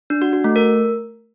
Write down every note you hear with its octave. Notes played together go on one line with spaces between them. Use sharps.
D4
F#4
F#4
A3
A#4